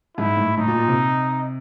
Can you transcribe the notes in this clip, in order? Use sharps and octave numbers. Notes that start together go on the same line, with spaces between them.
G#2 E4
A2
A2 D#4
A#2
A#2
C3